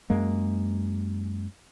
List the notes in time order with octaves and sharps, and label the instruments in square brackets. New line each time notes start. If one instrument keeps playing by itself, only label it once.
[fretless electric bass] F#2 G#3 A#3